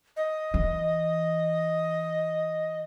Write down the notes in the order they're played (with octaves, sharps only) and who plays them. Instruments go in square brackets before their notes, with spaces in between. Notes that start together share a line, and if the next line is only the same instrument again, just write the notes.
[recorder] D#5
[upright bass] E3